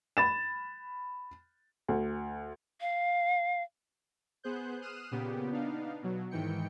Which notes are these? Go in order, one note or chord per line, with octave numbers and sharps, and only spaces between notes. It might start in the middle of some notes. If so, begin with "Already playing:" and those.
B5 A6 E7
D2
F5
B3 G#4 C5 F#6 G6
D#6 F6 F#6 C7 D#7 E7
A#2 C#3 B3 G4
B3 D4 D#4 F5
B2 F#3
G#2 D#3 E3 G5 C#7